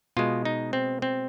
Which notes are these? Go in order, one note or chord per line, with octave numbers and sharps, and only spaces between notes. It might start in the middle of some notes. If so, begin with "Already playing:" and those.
B2 G#3 F4
D#4
C4
C4